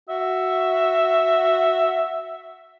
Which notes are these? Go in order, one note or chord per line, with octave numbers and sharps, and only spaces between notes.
F#4 E5